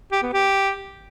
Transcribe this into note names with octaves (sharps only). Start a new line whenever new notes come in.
G4
B3
G4